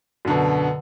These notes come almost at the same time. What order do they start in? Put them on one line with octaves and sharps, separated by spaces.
F#2 D3 B2